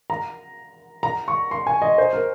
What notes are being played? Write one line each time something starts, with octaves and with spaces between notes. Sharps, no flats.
A#5
A#5
C#6
C6
G#5
D#5
C5
A#4